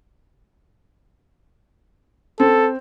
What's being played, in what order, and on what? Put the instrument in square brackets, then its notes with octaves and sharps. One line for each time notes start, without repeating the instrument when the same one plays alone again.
[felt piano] C4 [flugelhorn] A4